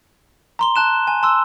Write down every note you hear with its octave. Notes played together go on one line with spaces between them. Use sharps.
A#5 C6 G7
A5 F#6 E7
G#5
A5 C6 E6